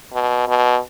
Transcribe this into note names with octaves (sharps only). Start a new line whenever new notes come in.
B2
B2